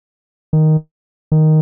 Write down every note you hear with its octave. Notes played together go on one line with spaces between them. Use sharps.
D#3
D#3